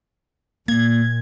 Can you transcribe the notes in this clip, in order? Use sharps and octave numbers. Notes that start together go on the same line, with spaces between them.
A#2 A#3 G#6